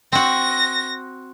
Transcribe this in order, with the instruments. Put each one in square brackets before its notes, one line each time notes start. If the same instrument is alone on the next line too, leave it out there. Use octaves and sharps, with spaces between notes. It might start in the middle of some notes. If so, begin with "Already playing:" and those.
[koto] C4 F#4 [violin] A#6